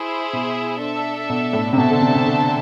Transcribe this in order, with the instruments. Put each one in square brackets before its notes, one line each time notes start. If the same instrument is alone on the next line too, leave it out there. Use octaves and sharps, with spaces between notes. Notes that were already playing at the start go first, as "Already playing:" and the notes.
Already playing: [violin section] E4 G#4 C5 E5
[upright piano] B2
[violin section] D4 A4 E5
[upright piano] B2
A2
C3
[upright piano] B2 [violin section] D4 A4 C5 E5 A5
[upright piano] D3
C3
C3
D3